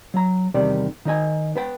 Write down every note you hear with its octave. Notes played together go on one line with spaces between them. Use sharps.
F#3 A#5
E2 C3 D#3 G3 D5
D#3 D#4 D#5 G#5
B3 B4 G5